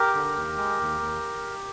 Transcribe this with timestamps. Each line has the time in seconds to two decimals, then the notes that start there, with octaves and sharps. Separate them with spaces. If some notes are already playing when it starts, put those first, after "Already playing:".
Already playing: G4 A#4
0.15 D3
0.36 D#2
0.57 G#3
0.80 D#2
1.01 D#2